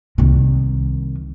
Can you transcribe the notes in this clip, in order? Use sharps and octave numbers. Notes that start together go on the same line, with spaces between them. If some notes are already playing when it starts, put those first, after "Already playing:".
C2 D#3